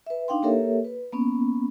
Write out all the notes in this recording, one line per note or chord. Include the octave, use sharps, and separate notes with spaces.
B4 E5
D4 D#4 F5 G5 C6
A#3 G4 A4 A#4 C#5 E5
B4
A#3 B3 C#4